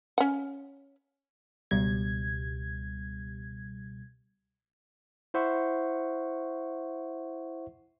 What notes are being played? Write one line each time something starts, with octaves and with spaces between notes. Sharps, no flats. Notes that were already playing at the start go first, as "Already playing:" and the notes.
C#4 F#5
C#2 B2 G3 G#6
E4 C5 E5 F#5 C#6